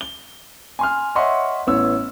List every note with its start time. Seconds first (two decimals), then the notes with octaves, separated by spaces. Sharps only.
0.01 G7
0.79 G#5 C6 F6
1.15 C#5 D#5 E5 F#5 C6 C#6
1.67 A1 B3 E4 C#5 E6